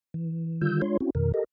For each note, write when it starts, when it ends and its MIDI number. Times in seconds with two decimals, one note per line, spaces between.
0.14 0.61 52
0.61 0.82 50
0.61 0.82 51
0.61 0.82 55
0.61 0.82 65
0.61 0.82 88
0.61 0.82 91
0.82 0.97 56
0.82 0.97 62
0.82 0.97 65
0.82 0.97 73
0.82 0.97 84
1.00 1.10 60
1.00 1.10 61
1.00 1.10 64
1.00 1.10 66
1.15 1.32 41
1.15 1.32 47
1.15 1.32 51
1.15 1.32 70
1.34 1.44 67
1.34 1.44 69
1.34 1.44 70
1.34 1.44 75